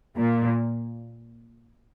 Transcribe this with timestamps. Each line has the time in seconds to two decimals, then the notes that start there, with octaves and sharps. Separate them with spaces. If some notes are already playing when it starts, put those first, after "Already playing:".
0.17 A#2